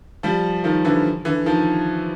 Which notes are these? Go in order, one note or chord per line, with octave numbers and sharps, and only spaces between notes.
F3 G3
D#3 F3
D3 E3
D3 E3
D#3 F3